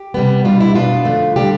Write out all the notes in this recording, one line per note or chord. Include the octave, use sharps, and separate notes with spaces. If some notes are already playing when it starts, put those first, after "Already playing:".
Already playing: G4
C3 G3 B3
B2 G3 D4 F4
E4
B2 B3 D4 F4
F2 D3 A3
D3 G3 D4 G4